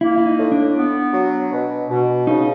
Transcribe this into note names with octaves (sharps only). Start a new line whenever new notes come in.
A#3 E4
E4
D#4
A2
D4
B3
F#3
B2
B2
C#3 D#4